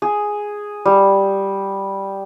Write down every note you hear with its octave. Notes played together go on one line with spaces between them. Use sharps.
G#4
G3